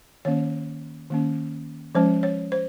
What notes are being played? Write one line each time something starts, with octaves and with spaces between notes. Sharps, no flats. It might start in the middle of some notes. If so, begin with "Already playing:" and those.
D#3 A#3 C#4 C#5
D#3 A#3 C#4
F3 G#3 C#4 C5
C#5
C5